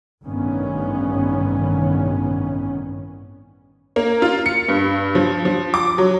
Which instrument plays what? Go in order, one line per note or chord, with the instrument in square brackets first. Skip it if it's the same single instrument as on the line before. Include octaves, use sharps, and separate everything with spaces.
[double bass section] A1 G2 C3 D#3 B3 C#4
[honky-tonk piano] A#3
F4
C#7
G2
F3
F3
D6
F#3